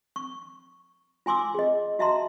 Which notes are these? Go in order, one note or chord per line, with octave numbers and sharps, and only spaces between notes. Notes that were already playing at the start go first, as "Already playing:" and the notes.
C#6
F4 G#5 C6 D6 E6
G#4 D#5
F#4 D#5 E5 A5 A#5 C6